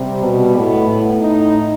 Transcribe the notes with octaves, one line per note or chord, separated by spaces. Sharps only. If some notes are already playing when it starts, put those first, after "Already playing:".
Already playing: C3 G3
B2
A2 B3
A2
D#4